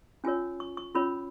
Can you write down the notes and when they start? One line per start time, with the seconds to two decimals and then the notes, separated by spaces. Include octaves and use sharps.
0.24 C#4 F4 A#4 C#5 G#5
0.60 C#6
0.77 C#6
0.95 C#4 F4 A#4 C#5 B5